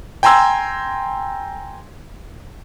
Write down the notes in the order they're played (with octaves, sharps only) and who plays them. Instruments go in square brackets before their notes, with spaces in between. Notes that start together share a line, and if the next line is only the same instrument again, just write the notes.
[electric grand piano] G5 G#5 A#5 C6 E6 G#6